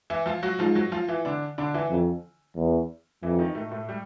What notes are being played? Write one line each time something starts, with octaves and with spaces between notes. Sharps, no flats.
E3 E4
F3 F4
F#3 F#4
G#2 F3 F4
F#3 F#4
F3 F4
E3 E4
D3 D4
D3 D4
E3 E4
F2
E2
F2 E3 E4
D#3 D#4
A2 A3
A2 A3
G3